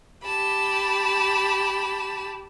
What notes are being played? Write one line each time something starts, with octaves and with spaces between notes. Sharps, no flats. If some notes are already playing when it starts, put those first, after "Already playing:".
G4 A5 B5